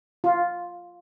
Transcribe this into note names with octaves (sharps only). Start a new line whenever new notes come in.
F4